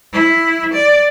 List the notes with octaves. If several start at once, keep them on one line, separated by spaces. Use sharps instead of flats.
E4
D5